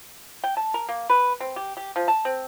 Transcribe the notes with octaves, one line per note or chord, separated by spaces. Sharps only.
G5
A5
A#4
A#3
B4
C4
G4
G4
F3
A5
C4